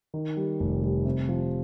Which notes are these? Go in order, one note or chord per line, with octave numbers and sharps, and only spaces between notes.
D#3
G3
F1
G3
C3
F3